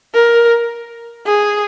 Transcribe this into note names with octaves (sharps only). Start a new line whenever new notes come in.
A#4
G#4